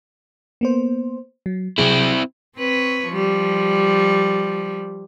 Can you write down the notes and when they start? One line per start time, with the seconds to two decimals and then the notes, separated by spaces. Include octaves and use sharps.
0.61 A#3 B3 C5
1.46 F#3
1.78 C3 F#3 C4 E4 G#4
2.56 C4 B4 C#5
3.08 F3 G3